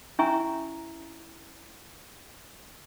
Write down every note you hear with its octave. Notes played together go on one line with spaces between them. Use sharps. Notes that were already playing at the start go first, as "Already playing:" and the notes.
C#4 E4 E5 G#5 A#5 C#6